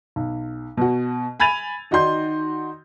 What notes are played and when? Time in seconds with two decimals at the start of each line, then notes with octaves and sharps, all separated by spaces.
0.16 B1
0.77 B2 F#4
1.40 G#5 B5 G#6 A6 D#7 F7
1.91 D#3 D#4 F#4 D5 C6 G6